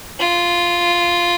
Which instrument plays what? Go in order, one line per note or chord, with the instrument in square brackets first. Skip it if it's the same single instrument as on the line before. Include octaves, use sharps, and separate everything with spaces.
[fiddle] F4